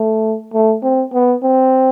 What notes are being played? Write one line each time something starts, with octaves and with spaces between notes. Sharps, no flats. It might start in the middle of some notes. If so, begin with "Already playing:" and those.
Already playing: A3
A3
C4
B3
C4